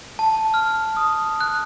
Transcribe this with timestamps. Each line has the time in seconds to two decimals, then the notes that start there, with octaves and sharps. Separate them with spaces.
0.19 A5
0.54 F6
0.97 D#6
1.41 F#6